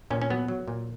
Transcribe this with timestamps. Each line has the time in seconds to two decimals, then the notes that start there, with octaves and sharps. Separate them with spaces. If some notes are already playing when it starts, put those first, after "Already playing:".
0.11 A#2 C#4
0.22 C#4
0.30 F#3 B3
0.48 F#3
0.68 A#2